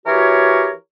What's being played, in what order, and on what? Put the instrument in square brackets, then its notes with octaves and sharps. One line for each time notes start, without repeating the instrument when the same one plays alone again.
[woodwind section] E3 F#4 G4 A#4 C#5